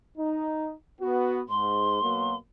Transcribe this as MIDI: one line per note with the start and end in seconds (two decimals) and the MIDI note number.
0.17 0.72 63
1.01 1.40 59
1.01 1.40 66
1.49 2.01 44
1.49 2.36 84
2.01 2.35 47
2.01 2.35 54
2.01 2.35 58